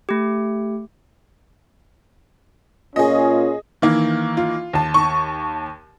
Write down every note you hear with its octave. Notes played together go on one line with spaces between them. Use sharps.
A3 G4
A#2 C#4 F4 G#4 D#5
D#3 E3 A#3
F4
D#2 A5
C#6